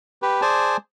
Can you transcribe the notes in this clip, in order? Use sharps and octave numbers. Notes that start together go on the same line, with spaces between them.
G4 B4
G#4 C5 D5 G#5 A5